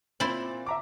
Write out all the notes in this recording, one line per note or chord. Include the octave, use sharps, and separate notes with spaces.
A#2 C4 E4 C5 D5
E5 A#5 D6